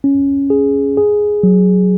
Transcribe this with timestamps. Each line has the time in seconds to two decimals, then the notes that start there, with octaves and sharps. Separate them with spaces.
0.04 C#4
0.50 G#4
0.97 G#4
1.43 F#3